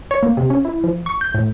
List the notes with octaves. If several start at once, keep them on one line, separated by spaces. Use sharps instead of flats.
C#5
A#3
C3
C#4
E4
F3
C#6
G6
A2